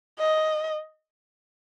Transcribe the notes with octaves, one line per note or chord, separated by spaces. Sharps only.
D#5